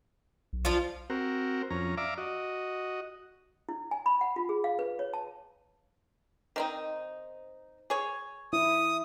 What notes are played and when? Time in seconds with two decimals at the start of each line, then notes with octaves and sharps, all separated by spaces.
0.53 B1
0.65 F3 D4 F4
1.10 C4 F#4 A#4
1.70 F2 C#4 A#5
1.98 D5 E5 F5 A#5 D6
2.18 F#4 D#5
3.69 E4
3.91 G#5
4.06 B5
4.21 F#5
4.36 F4
4.49 G#4
4.64 F5
4.79 B4
4.99 C#5
5.13 A5
6.56 D#3 C4 D#4
7.90 G#4 C#5
8.53 E4 D#6